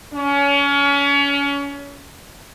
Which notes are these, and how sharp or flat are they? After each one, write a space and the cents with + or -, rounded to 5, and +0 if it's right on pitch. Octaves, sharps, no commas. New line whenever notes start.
C#4 +30